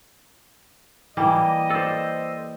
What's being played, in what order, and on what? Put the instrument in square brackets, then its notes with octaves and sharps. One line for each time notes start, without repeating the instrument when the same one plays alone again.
[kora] E3 A#3 [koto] G3 [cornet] D#5
[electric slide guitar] A4 C5 [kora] D5